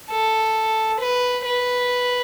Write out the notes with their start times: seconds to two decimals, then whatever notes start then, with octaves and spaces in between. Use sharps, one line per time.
0.10 A4
1.00 B4
1.45 B4